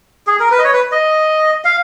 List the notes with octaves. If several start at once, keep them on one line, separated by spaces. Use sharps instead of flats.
G#4
A#4
B4
D#5
C#5
B4
D#5
F5